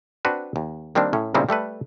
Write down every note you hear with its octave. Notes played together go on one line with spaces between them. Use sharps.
C4 D4 F#4 B4 C5
D#2
D#3 G3 A#3 C4 D4
A2 C#4
A#2 C#3 G3 C4 D#4 E4
G3 A3 A4 B4